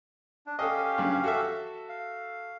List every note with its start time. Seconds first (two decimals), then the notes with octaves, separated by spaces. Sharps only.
0.47 D4
0.59 C#4 G4 A4 D#5 F5
0.98 G2 C#3 F#3
1.24 F#4 A4 E5
1.89 F5